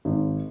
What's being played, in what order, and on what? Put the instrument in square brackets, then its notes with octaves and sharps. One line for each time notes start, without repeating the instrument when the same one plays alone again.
[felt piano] G#1